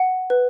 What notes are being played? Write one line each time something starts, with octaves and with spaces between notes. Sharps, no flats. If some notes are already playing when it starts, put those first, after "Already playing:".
Already playing: F#5
B4